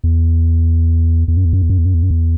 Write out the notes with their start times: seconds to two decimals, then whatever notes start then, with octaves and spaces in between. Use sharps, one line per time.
0.04 E2
1.28 E2
1.37 F#2
1.45 E2
1.53 F#2
1.62 E2
1.70 F#2
1.78 E2
1.85 F#2
1.94 E2
2.03 F#2
2.11 E2